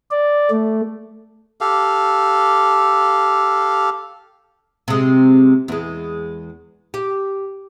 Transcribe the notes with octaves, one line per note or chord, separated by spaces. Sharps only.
D5
A3
G4 A4 F5
C3 G#3
E2 G#3
G4